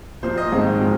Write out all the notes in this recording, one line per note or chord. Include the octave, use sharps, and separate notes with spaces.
A#2 F3 A#3 C5
D#5
G#2 D#3 G#3 C4
A#2 F3 A#3